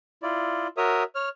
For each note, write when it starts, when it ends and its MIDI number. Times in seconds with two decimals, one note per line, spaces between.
0.23 0.67 64
0.23 0.67 65
0.23 0.67 74
0.77 1.03 66
0.77 1.03 70
0.77 1.03 73
0.77 1.03 76
0.77 1.03 87
1.15 1.29 73
1.15 1.29 89